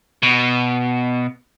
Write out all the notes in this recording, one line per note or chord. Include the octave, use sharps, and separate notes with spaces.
B2